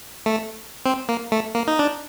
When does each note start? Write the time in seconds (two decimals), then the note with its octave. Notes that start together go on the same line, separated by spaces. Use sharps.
0.26 A3
0.86 C4
1.09 A#3
1.32 A3
1.55 A#3
1.67 D#4
1.79 D4